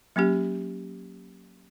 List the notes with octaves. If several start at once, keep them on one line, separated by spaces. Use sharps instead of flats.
F#3 A#3 C#4 G4